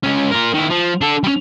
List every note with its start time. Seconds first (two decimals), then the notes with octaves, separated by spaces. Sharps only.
0.04 G#3 C#4
0.32 F4 A#4
0.54 D#3 E4
0.70 F3
1.01 D4 A4
1.24 G3 C#4